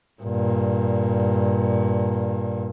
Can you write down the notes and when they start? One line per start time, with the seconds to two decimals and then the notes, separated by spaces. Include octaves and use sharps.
0.22 G2 A#2